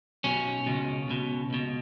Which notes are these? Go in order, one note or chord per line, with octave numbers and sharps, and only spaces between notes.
B1 B2 C#4
C#2 B2
C#2 B2
C#2 B2